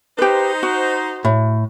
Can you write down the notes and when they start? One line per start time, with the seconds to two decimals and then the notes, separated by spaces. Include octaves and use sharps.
0.19 D#4 G4 B4 C5
0.63 F#4
1.25 A2